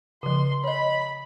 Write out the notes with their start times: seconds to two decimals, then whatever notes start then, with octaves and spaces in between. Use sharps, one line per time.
0.23 C#3 F3 C6
0.64 C#5 D#5 B5